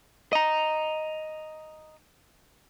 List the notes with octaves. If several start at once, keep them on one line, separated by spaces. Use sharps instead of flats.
D#5 A#5